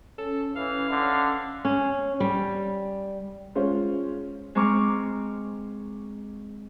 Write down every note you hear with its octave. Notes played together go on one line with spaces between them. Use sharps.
C#4 A4
E3 F5
D3
C#4
G3
G#3 C#4 F4 C5
G#3 C4 A#5 C#6 D6 F6